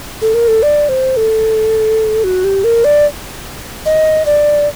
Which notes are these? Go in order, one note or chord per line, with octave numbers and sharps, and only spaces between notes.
A4
A#4
A4
D5
C5
A4
F#4
G4
A#4
D5
D#5
D5